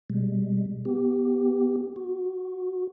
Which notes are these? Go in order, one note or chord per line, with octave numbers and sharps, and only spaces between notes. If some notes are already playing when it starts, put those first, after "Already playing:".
B2 G3 G#3
B3 G4
F#4